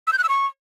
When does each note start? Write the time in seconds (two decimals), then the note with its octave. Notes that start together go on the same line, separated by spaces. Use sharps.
0.07 E6
0.13 G6
0.18 F#6
0.24 E6
0.29 C#6